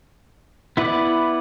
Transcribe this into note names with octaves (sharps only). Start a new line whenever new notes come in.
B3 E4 B4 D5